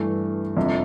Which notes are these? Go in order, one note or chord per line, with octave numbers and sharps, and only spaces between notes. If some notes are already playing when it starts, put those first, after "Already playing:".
Already playing: G2 E3 A3
G1 F2 C3